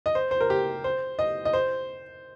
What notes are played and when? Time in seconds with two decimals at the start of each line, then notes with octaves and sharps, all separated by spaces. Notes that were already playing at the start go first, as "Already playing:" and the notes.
0.06 D#5
0.15 C5
0.31 C5
0.41 A#4
0.50 G4
0.84 C5
1.19 D#5
1.45 D#5
1.53 C5